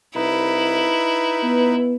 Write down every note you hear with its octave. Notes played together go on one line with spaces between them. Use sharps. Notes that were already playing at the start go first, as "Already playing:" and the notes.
C2 D#4 E4 B4
B3